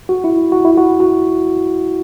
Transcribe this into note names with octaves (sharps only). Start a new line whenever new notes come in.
F#4
E4
F#4
E4
F#4
F#4